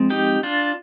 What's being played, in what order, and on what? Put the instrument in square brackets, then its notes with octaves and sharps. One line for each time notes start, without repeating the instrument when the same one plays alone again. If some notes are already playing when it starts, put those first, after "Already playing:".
Already playing: [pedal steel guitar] F3 G#3 C4
D#4 G4
D4 F4